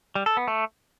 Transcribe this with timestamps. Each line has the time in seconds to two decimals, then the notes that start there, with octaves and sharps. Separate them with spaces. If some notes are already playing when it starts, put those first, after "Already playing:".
0.15 G3
0.26 A4
0.37 B3
0.48 A3